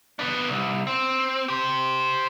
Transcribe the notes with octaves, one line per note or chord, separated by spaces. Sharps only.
B3 D4
C2
C4
G4 C5